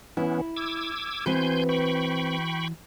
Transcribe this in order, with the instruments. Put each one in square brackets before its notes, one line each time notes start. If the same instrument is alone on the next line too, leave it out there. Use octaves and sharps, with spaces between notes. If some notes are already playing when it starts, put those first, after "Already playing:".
[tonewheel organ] E3 B3 C#4 [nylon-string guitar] E4
[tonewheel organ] D6 E6 G#6
[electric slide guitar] E3 F#4 [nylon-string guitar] C4 B4 [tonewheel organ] G#5 C6 G6
[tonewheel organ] G5 B5 C#6